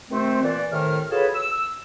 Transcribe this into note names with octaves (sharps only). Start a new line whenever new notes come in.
C3 D#3 A3 C4
A#2 E3 D5
A2 C3 D#3 A#4 F6
F4 F#4 G#4 A4 B4 C#5
E6